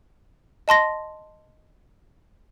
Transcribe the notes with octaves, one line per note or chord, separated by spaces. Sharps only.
D#5 A5 C6 A#6